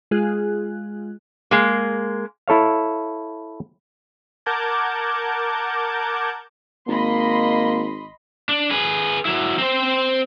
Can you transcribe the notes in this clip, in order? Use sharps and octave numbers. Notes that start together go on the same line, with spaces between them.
G#3 F4 G#4 F#6
G#3 A#3
E4 A4 C#5 F5
A#4 F#5 A5 D6 G6 G#6
G#1 A#3 D#5 B5 C6
D4
G#4 B4
F#3 E4
C4 C5